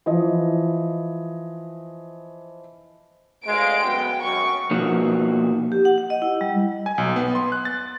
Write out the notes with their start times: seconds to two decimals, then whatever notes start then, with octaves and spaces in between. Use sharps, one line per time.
0.06 E3 F3 D#5
3.46 D2 G#3 F5 D7
3.85 F#2 B3 G5
4.24 F#2 C#6
4.71 B2 F3 A#3 D#4 F#4
5.72 G4
5.85 F#5
5.98 F#5
6.10 D#5
6.22 E4
6.41 G3
6.86 G#5
6.98 B1
7.16 B3
7.35 C6
7.52 F#6
7.65 A6